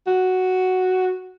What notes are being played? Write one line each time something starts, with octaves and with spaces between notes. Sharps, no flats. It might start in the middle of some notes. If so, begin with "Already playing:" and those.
F#4